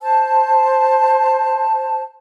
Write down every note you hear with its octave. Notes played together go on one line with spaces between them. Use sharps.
C5 A5